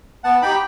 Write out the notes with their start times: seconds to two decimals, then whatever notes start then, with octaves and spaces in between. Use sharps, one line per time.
0.24 B3 F#5 A5
0.42 D#4 G4 G5 B5